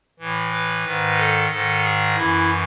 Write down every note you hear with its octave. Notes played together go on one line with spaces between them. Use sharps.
A2 E3
B4
G#2 D#3
A4
G#2 D#3 A4
G#4
F#2 E3 E4